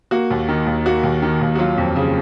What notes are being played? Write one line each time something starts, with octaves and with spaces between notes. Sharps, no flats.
A#3 F#4
D#2
D#3
D#2
A#3 F#4
D#2
D#3
D#2
F#4
F#3 F4
F2
C#3